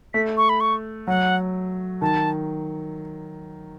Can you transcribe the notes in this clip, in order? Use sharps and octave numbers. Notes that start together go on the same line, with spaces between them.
A3 B6
C#6
B5
C#6
F#3 F#5
D#3 A5